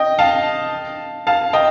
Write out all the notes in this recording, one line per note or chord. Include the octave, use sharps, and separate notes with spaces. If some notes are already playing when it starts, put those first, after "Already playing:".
Already playing: D#5 G5
F5 A5
F5 A5
D#5 G5